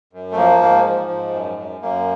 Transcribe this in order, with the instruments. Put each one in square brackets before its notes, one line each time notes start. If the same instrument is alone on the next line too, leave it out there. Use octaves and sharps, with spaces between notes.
[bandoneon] F#2
A3
F3 A#3
G#2 A#3
F3
G#2
F#2
F#2
F#2 A#3